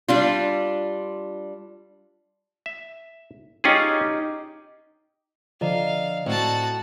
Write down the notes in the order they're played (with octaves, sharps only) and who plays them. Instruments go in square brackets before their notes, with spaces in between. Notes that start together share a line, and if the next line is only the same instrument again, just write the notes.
[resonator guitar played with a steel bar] G3 D4 F4
[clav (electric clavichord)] E5
[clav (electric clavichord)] C#4 F4 G#4 [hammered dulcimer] D#4 G4
[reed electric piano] D3 F3 D4 [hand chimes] D5 D#5 A#5 [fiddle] F5
[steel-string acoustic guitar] A2 [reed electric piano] C4 [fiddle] F#4 A5